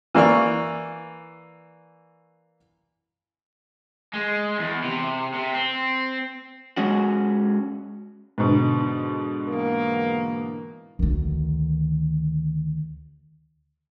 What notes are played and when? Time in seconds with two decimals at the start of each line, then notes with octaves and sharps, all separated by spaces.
0.14 E3 A#3 D5 C#6
4.14 G#3
4.59 E2
4.84 C3
5.34 C3
5.54 C4
6.77 G#3 C#4 F#4
8.38 G#2 B2 D3
9.49 E3 A#3 B3
10.99 D2 D#3